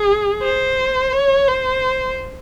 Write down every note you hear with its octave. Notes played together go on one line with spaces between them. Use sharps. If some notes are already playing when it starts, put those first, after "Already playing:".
Already playing: G#4
C5
C#5
C5